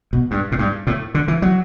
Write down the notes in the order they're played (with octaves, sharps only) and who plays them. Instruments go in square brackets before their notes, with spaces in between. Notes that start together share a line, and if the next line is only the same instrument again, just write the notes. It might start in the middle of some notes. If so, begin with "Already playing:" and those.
[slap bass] B2
G2
A2
G2
A2
D3
E3
F#3